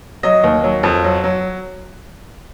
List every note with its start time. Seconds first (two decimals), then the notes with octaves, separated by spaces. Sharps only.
0.23 F#3 D#5
0.44 D#2
0.64 F#3
0.83 F2
1.04 F#3
1.24 F#3